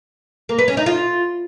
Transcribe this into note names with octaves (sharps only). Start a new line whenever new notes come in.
A#3
B4
C#4
D#4
F4